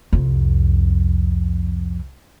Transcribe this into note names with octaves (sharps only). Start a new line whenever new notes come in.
C2 F2